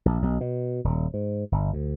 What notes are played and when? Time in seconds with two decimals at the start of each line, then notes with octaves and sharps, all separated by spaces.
0.05 A#1
0.22 B1
0.41 B2
0.84 D#1
1.14 G#2
1.52 G1
1.73 D2